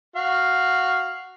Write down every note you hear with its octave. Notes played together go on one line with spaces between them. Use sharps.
F#4 F5